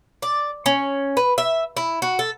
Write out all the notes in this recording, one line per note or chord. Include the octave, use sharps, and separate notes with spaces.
D5
C#4
B4
E5
E4
F#4
A4